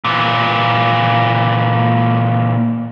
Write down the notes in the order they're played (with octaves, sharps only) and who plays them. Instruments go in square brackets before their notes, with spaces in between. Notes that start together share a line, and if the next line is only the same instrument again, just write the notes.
[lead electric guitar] A#2 E3